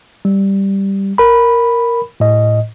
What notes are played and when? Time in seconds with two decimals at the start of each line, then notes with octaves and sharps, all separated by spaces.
0.25 G3
1.18 A#4 B5
2.20 A2 D#5